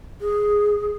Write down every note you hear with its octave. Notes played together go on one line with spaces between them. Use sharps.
G#4